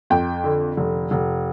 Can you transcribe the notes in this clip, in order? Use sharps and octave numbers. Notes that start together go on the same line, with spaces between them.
F2 G5
D3
F1
F1